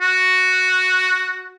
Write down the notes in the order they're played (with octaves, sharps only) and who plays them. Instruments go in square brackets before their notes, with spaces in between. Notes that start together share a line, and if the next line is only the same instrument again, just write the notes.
[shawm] F#4